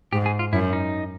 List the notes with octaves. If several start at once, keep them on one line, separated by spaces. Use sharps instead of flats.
G#2 G4
G#4
F4
F#2 E4
D#4